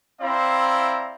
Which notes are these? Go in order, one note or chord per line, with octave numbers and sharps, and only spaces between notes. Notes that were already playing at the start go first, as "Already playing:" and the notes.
C4 E4 C5 D5 F5 A#5